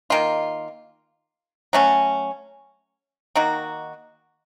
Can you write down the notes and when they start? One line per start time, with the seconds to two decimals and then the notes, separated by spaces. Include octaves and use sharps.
0.10 D#3 A#3 F4
1.73 F#3 A3 C#4
3.35 D#3 A#3 D#4 F#4